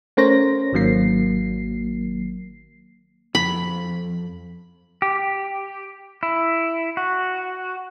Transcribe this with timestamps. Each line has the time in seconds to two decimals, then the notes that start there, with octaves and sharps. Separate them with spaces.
0.17 A3 C#4 A#4 C5 C#5 A#6
0.73 G#1 D#3 F#3 A#3 C7
3.35 F2 B5
5.02 G4
6.23 E4
6.97 F#4